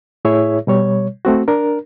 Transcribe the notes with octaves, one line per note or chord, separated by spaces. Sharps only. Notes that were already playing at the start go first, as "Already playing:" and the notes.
A2 E4 G#4 C#5 E5
B2 G3 C#5
A3 C4 F#4
D4 A#4